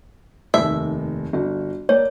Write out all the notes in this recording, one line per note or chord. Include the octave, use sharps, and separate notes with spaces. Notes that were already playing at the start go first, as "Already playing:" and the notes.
F1 D#2 E5
G1 F#4
A#3 C#5 D5